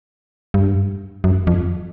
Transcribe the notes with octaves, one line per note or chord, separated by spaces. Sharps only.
G2
F#2
F2